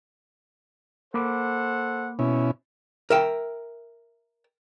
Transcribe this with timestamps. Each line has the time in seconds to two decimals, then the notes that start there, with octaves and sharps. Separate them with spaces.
1.14 A#3 A4 C5 F#5 B5 D6
2.19 B2 C#4 E4
3.10 A#4 E5 G5